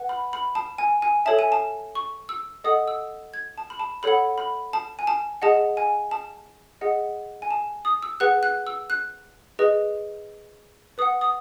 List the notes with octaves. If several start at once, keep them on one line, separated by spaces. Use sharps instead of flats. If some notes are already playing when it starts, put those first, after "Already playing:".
Already playing: B4 F#5
B5
B5
A5
G#5
G#5
A4 C#5 E5 A5
G#5
A5
C#6
E6
A4 D#5 F#5 D#6
E6
G#6
A5
B5
A5
A4 C#5 F#5 B5
B5
A5
G#5
A5
G#4 D#5 F#5 A5
G#5
A5
G#4 D#5 F#5
G#5
A5
D#6
E6
G#4 B4 F#5 F#6
F#6
E6
F#6
G#4 B4 D#5
B4 F#5 D#6
D#6